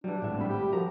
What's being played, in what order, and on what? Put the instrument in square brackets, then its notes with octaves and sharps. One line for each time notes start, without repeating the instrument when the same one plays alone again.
[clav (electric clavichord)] E3 G3 [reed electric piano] F#3 [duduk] D4
[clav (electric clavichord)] G#1 A2 E5
[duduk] G3 [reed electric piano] C4 B5
[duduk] G4
[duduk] F3 [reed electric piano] F#4 A4 A#4 [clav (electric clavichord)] A#5